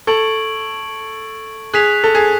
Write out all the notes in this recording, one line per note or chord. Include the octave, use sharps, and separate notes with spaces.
A4 C#6 G#6 D7 F#7
G#4 F#6 B6 F7
A4
G#4